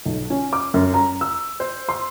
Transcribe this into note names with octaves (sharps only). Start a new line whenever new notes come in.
B1
C#4
D6
F#2
A#5
E6
C5
C6